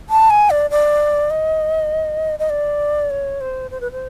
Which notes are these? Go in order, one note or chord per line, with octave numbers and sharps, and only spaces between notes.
A5
G#5
D5
D5
D#5
D#5
D5
C#5
C5
C5
B4
C5